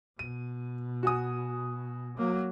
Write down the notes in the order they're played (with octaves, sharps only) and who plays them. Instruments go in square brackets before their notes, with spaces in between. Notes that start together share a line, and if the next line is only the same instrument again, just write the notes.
[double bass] B2 [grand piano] D#7
[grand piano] F#4 G#5 D#6
[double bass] F#3 A#3